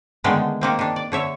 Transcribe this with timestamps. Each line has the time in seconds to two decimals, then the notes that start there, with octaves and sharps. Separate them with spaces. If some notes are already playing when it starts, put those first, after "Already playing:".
0.24 D3 D#3 G#3 A3 B3
0.61 D#3 A#3 C4
0.79 D#3 D4
0.96 D5
1.12 D3 C#5 E5